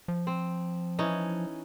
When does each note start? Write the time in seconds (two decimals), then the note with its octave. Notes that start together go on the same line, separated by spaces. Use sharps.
0.08 F3
0.27 C4
0.99 E3 C#4 D#4